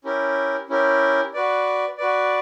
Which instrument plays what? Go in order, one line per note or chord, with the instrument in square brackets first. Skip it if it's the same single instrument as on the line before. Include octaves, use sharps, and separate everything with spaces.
[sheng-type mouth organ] C#4 E4 G4 A#4
C#4 E4 G4 A#4
F#4 B4 D5
F#4 B4 D5